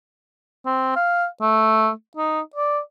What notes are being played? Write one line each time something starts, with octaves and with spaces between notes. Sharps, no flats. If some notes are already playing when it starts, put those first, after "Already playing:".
C4
F5
A3
D#4
D5